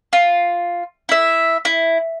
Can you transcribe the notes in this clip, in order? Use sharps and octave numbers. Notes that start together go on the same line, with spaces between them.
F4
E4 E5
E4